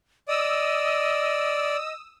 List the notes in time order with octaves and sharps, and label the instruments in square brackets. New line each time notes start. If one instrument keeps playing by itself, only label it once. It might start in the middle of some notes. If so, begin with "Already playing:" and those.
[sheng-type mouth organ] D5 [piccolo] D#5 [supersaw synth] D#6 E6